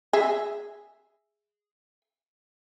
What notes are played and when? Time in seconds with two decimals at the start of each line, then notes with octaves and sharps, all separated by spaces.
0.13 G#4 E5